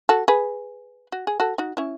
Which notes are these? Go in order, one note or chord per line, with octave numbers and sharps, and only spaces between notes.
F#4 A4
G#4 B4
F#4
G#4
F#4 A4
D#4 F#4
C#4 E4